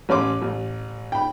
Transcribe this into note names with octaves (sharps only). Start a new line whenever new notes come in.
A1 C#4 C6 D6
A1
G5 B5